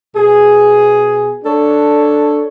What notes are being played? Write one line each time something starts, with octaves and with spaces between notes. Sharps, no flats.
B2 G#4
D4 A4 C#5